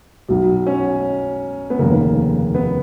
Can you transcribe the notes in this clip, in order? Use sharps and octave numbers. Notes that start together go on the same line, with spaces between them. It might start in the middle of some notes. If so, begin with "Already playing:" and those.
B1 B2
C#4
B3
F1 D#2 C#3 A#3
B3